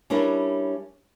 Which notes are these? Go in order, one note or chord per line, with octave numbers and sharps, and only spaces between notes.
G3 C#4 D4 E4 A#4